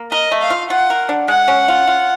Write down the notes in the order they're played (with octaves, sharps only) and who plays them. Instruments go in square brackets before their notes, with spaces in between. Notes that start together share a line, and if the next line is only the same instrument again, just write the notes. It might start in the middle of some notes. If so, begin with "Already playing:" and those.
Already playing: [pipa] A#3
[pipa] A#4 [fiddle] D#5
[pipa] A3
[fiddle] F5
[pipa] F4
[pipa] F4 [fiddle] F#5
[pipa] A#4
D4
[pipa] G#3 [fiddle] F#5
[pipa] C#4
F4
F4